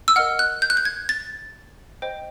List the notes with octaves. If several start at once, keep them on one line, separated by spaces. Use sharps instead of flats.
E6
A#4 D#5 F#5 F6
F#6
G6
F#6
G6
G#6
A6
C5 D#5 G5